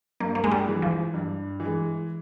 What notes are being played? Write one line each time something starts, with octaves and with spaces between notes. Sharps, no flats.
G2 A#3
A#3
G#3
G3
E3 G#3
F3
G2
E3
G#3